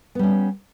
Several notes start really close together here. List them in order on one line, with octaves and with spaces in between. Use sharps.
B3 G3 C#4